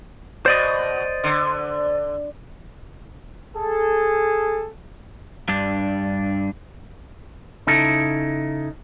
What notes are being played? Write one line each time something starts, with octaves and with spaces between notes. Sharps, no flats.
B2 C5 D5 D#5
D3
G#4 A4
G2 D4
C#3 D#4 E4 A4